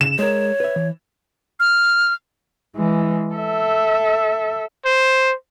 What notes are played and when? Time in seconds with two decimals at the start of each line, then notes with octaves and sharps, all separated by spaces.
0.01 C#3 E7
0.19 G#3 A#4 C#5
0.60 B4 E5
0.76 E3
1.60 F6
2.76 E3 G#3
3.35 A4 E5
4.85 C5